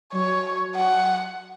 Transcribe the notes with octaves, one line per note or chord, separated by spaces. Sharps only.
F#3 C#5
F#5